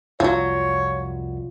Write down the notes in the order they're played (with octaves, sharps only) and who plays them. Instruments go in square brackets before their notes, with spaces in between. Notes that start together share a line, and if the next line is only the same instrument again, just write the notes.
[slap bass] C2 F2 [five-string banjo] F3 F#3 [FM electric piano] F4 [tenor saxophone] C#5